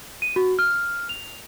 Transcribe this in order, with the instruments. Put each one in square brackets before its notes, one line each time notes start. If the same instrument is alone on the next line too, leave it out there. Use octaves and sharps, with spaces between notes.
[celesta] D#7
F#4
F6
F7